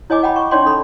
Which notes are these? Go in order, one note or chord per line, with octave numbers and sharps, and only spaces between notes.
E4 C#5 D#5 G#5 D6
F#5 G5 B5
C#6
C#4 D#4 C#5 D5 G5 C6
A4 B5